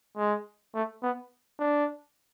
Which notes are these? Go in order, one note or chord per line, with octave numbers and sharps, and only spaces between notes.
G#3
A3
B3
D4